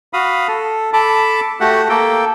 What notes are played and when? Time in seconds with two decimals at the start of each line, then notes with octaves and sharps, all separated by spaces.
0.13 F#4 F5 B5 D#6
0.48 A4
0.93 A4 A5 B5 D6
1.60 A3 F#4 G4 F#5
1.89 A#3 A4 G5